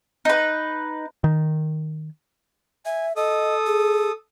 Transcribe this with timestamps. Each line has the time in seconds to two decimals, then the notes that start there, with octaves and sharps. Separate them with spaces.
0.25 D#4 B4
1.24 D#3
2.86 E5 G#5
3.16 A4 D#5 D#6
3.66 G#4